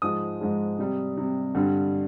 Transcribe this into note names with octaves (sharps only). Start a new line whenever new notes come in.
G#2 F3 G#3 D#6
G#2 F3 G#3
C3 G3
C3 G3
G2 D3 G3